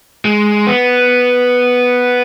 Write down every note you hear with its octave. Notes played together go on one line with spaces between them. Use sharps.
G#3
B3